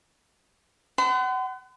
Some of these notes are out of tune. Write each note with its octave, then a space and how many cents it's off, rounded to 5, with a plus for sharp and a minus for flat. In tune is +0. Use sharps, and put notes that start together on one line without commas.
F#5 +30 C6 -45